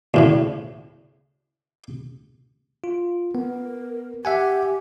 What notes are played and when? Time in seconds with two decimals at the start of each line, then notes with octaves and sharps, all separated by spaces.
0.14 D2 A2 C#3
2.84 F4
3.35 B3 A#4
4.25 G4 E5 F#5 G#5